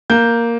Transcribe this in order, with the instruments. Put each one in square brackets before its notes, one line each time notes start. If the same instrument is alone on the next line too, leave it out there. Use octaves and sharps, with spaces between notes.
[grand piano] A#3 G6